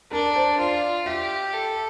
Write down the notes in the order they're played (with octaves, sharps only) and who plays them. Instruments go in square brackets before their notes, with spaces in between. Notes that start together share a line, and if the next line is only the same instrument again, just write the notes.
[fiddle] D4 [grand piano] A#4
[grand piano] C5
[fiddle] F4 [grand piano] D5
[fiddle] G4 [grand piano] E5
[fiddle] A4